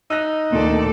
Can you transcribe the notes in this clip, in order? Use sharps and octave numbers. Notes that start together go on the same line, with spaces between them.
D#4 E6 F#6 A#6
D2 A#2 D#3 A4 D5